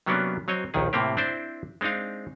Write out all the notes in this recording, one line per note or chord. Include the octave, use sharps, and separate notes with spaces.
C3 F#3 A#3 B3 C#4 D4
F#3 C4 C#5 D#5
A#1 D#2 D#3 G#4
A2 C3 A#3 C4 G4
C4 D4 E4 C5 D5
G#3 C4 D4 D#4 F5